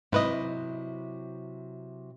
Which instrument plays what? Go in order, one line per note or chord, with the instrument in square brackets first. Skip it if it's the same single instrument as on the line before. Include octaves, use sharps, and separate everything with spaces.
[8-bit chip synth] G#2 B4 D#5 [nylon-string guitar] C3 F#3 E4